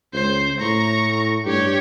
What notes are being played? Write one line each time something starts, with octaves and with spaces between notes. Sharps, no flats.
C#2 C5
A2 A#5 C#6
G2 G4 C#5